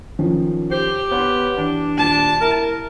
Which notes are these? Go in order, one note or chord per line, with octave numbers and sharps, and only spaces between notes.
D#3 F3 C#4
G4 C5
B3 C#5 C6
E3 D4
D#1 A5
E4 A#4